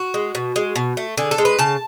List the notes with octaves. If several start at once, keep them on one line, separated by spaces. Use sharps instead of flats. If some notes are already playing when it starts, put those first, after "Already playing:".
Already playing: F#4
G#3
B2
G#3
B2
A3
D3 G#4
A4
G#3
B4
C#3 A5